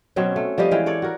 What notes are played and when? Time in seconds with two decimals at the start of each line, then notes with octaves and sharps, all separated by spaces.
0.16 B2 F#3 C4 C#4
0.36 A3
0.58 F3 G3 G4 D#5
0.71 E3 G#3 F5 G5
0.86 A4 C#5 D5
1.02 F#4 A#4